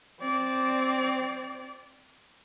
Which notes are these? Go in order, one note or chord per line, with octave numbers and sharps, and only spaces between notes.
C4 D5